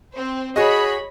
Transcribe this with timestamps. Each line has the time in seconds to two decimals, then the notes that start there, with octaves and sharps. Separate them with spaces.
0.12 C4 C5
0.56 F#4 G#4 C#5 D#5 B5